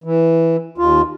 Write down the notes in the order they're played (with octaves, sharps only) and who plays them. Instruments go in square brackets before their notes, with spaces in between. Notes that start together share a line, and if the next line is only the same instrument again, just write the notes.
[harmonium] E3
D#2 F4